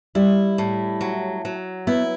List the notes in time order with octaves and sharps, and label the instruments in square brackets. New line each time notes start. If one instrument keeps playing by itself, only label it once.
[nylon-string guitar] G3 [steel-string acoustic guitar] E4
[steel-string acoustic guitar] A2
F#3
F#3
[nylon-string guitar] B3 [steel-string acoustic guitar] E4